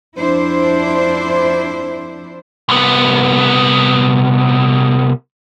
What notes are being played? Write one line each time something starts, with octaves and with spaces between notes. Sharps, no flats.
F2 D4 E4 C5
C2 B3